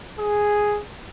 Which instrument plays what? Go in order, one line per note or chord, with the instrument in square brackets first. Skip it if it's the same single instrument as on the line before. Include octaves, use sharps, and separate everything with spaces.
[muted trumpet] G#4